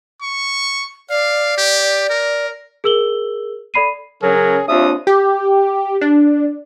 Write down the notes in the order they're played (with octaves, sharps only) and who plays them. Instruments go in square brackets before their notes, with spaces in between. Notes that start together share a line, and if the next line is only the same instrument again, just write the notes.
[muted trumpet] C#6
[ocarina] D5 [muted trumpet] F5
[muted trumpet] G4
A#4
[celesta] G#4 A#4 E6 F#7 G7
A4 D5 B5 C7 D#7
[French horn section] C#3 C#4 [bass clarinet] F#3 [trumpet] G#4 [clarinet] A#4
[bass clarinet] D#2 [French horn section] C4 D4 F4 [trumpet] E5 [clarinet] D#6
[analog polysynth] G4
D4